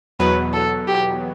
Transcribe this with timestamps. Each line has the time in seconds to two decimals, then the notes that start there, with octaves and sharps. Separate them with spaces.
0.19 E2 B2 F#3 B3 B4
0.53 A4
0.87 G4